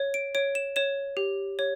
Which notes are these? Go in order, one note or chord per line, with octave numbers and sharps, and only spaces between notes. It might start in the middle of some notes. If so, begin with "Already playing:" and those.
Already playing: C#5
D7
C#5 D7
E7
C#5 E7
G4
C#5